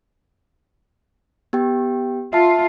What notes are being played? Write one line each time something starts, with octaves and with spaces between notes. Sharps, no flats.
B3 G4 G5
F4 E5 A5